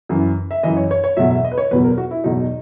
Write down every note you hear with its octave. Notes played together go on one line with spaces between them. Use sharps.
F#2 E3
E5
F#2 E3 D#5
C#5
C#5
C#5
E2 B2 F#3 E5
E5
D#5
B4
C#5
E2 B2 F#3 B4
A#4
F#4
E4
E2 B2 F#3 D#4